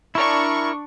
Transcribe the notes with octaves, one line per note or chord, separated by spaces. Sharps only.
D4 E4 A#4 C#6